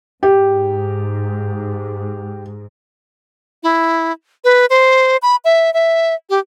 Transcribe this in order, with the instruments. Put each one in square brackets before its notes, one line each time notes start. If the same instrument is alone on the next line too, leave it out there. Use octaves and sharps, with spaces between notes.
[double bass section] G#2 [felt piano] G4
[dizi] E4
B4
C5
B5
E5
E5
G4